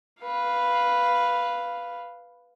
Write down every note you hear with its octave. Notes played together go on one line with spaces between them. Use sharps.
B4 F5